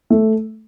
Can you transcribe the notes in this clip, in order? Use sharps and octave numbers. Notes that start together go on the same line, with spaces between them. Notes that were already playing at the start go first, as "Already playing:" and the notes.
A3